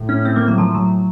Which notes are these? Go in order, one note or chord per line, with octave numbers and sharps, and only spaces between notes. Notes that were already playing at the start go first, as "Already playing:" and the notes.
Already playing: A2
C#4
C4
A#3
F#3
F3
F#3